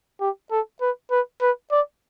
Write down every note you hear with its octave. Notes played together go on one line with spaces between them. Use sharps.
G4
A4
B4
B4
B4
D5